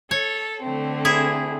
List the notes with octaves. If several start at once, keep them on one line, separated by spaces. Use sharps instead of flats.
A4 C#5
D3 A3 C4
E4 G#4